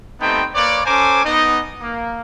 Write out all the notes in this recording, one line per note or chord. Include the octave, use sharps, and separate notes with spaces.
G3 A3 B3 C4 D#4 G5
A#3 B4 C#5 D5
C#4 A4 C5 G#5 A#5 D6
B3 D#4 D#5
A#3